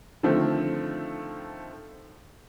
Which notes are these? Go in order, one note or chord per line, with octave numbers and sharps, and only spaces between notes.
D3 D#3 F3 A3 C4